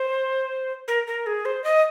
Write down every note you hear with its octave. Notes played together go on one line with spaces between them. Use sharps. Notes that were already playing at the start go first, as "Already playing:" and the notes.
Already playing: C5
A#4
A#4
G#4
C5
D#5